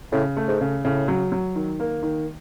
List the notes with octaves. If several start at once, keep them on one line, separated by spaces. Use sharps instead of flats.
A2 C#3
A3
G#2
C#3
A2 C#3
F#3
F#3
D#3
A#3
D#3